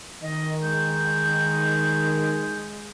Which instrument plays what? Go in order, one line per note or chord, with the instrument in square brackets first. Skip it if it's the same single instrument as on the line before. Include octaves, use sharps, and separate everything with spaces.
[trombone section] D#3 [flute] D#5
[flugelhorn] G#3 [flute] G6